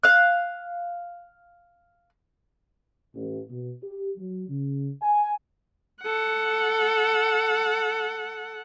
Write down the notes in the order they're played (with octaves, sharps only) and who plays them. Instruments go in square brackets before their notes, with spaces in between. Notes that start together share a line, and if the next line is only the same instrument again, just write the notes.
[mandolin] F5 F#6
[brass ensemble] A1
B2
G4
F#3
C#3
G#5
[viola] A4 F#5